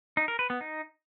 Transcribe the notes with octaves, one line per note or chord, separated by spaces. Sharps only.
D#4
A#4
B4
B3
D#4